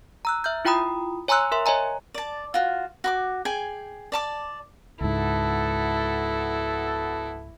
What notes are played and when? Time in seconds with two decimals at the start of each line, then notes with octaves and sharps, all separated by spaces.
0.25 A#5 E6 F#6
0.44 E5 F6 G6
0.65 E4 F4 G5 A#5 B5 D#6
1.28 C#5 G#5 A#5 C6 E6 F#6
1.52 A#4 E5 C6
1.66 C#5 D#5 G#5 A#5
2.14 D5 A5
2.54 F4 F#4
3.04 F#4 B5 D6
3.45 G#4 G5 G#5
4.12 D5 A5 D6
5.01 C#2 G#2 B3 E4 F#4 A4